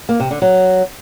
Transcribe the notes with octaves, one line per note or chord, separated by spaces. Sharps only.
A#3
C3
D3
F#3